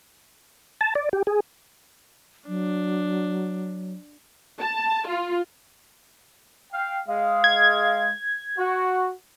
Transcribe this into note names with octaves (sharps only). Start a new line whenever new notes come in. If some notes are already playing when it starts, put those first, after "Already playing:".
A5
D5
G4
G#4
F#3 D4
A5
F4
F5 G5
G#3 F5
G#6
F#4